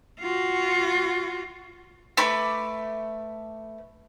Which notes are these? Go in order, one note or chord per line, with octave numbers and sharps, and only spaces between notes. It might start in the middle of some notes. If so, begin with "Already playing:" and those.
F4 F#4
A3 B4 B5 D6